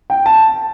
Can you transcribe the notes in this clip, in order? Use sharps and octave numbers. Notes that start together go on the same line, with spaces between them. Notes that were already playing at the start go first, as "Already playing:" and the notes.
G5
A5